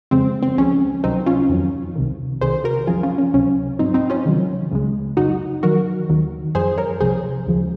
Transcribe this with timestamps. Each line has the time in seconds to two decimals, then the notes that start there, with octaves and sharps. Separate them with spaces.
0.11 F2 C#3 G#3 C4
0.43 C4
0.58 C#2 C#3 F3 G#3 C#4
1.03 C#2 C3 D#3 F#3 C4 D#4
1.26 C#4 F4
1.50 F2 D#3 F#3
1.96 C2 C3 D#3
2.41 C2 C3 D#3 G#4 C5
2.64 F#4 A#4
2.87 F#2 C#3 F3 G#3 F4 G#4
3.03 C#4 F4
3.18 C#4
3.34 C#2 C3 F#3 C#4
3.79 G#2 F#3 C4 D#4
3.94 C4 D#4
4.10 C#4 F4
4.25 C#2 C3 D#3 F#3
4.72 C#2 C#3 G#3
5.17 F#2 C#3 F#3 D#4 F#4
5.63 F#2 D#3 F#3 F#4 A#4
6.09 D#2 D#3 F#3
6.55 F#2 F3 G#3 G#4 C5
6.78 A#4 C#5
7.01 C2 C3 F3 G#4 C5
7.47 D#2 C#3 F3 G#3